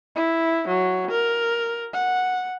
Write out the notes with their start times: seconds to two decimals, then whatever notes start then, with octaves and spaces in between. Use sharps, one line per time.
0.16 E4
0.68 F#3
1.11 A#4
1.93 F#5